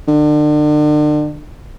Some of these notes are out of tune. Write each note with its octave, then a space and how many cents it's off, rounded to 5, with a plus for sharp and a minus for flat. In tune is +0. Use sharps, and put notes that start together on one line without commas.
D3 +35